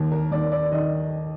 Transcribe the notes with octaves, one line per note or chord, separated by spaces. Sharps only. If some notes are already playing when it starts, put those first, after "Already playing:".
Already playing: D#2
A#4
D#2 D5
D5
D#3 D#5